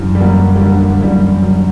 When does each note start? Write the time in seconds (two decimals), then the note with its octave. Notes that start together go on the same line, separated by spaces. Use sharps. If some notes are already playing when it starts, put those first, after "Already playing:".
Already playing: F#2 D3 E3 G3
0.15 G3
0.20 F#2 F#3 A#3
0.56 G3
0.61 D3 F#3 A#3
0.94 A#3
1.02 F#2 E3 G3
1.42 D3 F#3